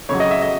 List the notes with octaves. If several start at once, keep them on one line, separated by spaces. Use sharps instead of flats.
F2 C#3 F#3 C#5
D#5
E5
D#5